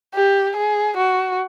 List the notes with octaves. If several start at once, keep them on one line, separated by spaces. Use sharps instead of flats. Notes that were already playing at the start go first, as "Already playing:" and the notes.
G4
G#4
F#4